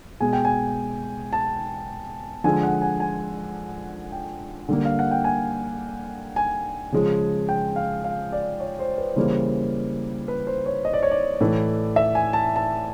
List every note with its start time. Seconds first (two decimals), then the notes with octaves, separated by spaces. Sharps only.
0.20 B2 G#3 G#5
0.33 G5
0.45 G#5
1.33 A5
2.44 D3 F3 G#3 G#5
2.63 F#5
2.82 G#5
3.00 G#5
4.12 G5
4.69 D3 G3 A#3
4.85 F5
4.99 F#5
5.11 G5
5.24 G#5
6.36 G#5
6.92 C#3 F3 G#3
7.49 G5
7.76 F5
8.04 F5
8.32 D5
8.60 C#5
8.79 C5
8.98 B4
9.16 C#3 E3 G3 A#3 C5
10.28 B4
10.47 C5
10.66 C#5
10.85 D#5
10.93 D5
11.03 C#5
11.11 D5
11.40 A2 E3 A3
11.96 E5
12.15 G#5
12.33 A5
12.56 A5